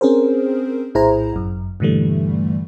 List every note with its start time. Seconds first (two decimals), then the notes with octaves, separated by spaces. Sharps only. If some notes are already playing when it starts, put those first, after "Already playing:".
0.01 C4 C#4 G#4 A#4 C5
0.95 A#1 A2 E4 G#4 C5 A#5
1.33 G1 F#2
1.80 G2 A#2 D3 E3 G3 A3